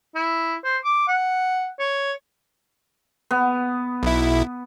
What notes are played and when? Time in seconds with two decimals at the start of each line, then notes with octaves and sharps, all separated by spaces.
0.15 E4
0.64 C5
0.85 D6
1.08 F#5
1.79 C#5
3.31 B3
4.03 B1 E4